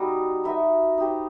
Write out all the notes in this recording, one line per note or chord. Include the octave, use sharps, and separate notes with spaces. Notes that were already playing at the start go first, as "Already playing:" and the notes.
Already playing: G3 D#4 F#4 A4 D#5
D#4 F#4 B4 E5
D#4 G4 C5